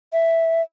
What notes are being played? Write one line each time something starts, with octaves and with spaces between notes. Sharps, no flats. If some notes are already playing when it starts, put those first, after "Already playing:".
E5